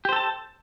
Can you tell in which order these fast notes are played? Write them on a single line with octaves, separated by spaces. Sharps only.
G4 C5 A4 A5